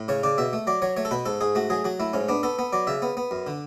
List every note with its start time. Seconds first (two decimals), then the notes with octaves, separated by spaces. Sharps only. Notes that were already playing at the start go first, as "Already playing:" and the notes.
Already playing: A2
0.08 C#3 C#5
0.23 C#3 D5
0.38 B2 E5
0.53 A3
0.67 F#3 D5
0.82 F#3 C#5
0.97 A3 C#5
1.05 A4
1.11 B2 B4
1.26 G#2 A4
1.41 G#2 G#4
1.55 A3 F#4
1.70 F#3 G#4
1.84 F#3 F#4
2.00 A3 E4
2.13 G#2 C#4
2.28 B3 D4
2.43 B3 A4
2.59 B3
2.73 F#3 D5
2.87 C#3 E5
3.02 B3
3.17 B3
3.31 F#2
3.47 D3